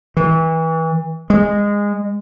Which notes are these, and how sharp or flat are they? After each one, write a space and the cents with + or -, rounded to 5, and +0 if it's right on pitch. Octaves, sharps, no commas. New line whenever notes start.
E3 -30
G#3 -20